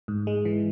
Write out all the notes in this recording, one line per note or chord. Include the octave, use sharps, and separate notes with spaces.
G#2
G#3
E3